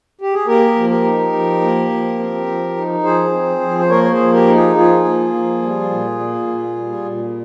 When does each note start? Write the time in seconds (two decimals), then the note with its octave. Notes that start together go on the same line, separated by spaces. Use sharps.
0.21 G4
0.33 G#4
0.46 A#3 G4 A#4
0.75 F3
0.90 G4 A#4
1.04 D#4
1.32 F3
1.61 A#3
1.90 F3
2.19 C4
2.47 F3
2.76 D#4
3.04 F3 G#4 C5
3.32 C4
3.61 F3
3.79 C5
3.90 A#3 A#4 C#5
4.03 C#5
4.11 G#4 C5
4.18 F3
4.33 G4 A#4
4.47 D#4
4.54 F4 G#4
4.75 F3 F4 G#4
5.04 A#3
5.33 F3
5.62 G3
5.90 A#2
6.19 A#3
6.47 A#2
6.76 G3
7.05 A#2